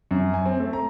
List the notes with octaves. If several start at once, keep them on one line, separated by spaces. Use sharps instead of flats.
F#2
G#5
C4
A3
A#5